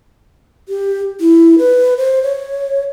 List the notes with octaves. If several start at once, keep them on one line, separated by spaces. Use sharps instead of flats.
G4
E4
B4
C5
C#5